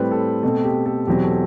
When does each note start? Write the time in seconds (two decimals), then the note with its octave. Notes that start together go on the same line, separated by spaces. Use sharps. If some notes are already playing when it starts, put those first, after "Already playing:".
Already playing: A2 G3 C4 B4
0.11 A4
0.43 B2 A3 C4 A4
0.64 G4
0.86 A4
1.07 E2 B2 F#3 C4 G4
1.24 A4